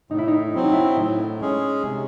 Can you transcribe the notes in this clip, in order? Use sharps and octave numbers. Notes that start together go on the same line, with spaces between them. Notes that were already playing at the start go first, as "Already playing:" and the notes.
A2 D#4
E4
D#4
F#3 C4 E4
D#4
E4
A2 D#4
G#3 C#4 G#4
C3